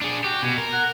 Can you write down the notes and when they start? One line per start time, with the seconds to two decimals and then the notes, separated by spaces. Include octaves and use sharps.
0.02 D4 G#4
0.24 F#4 G4
0.42 B2 G#5
0.58 A#4
0.72 F#5